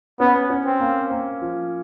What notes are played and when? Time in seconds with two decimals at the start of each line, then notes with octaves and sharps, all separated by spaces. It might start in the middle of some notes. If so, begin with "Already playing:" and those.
0.20 B3 C#4
0.50 C#4
0.66 C4
0.80 A#3
1.11 A#3
1.41 F3